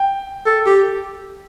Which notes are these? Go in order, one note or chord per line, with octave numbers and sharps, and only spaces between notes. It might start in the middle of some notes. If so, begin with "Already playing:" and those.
Already playing: G5
A4
G4